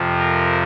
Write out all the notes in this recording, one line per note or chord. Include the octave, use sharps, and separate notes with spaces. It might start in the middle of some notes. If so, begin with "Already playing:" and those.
Already playing: F2 C3 F3
A#4